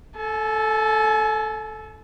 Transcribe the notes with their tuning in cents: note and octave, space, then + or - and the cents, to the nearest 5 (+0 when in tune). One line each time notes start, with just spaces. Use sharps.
A4 -5 G#5 +40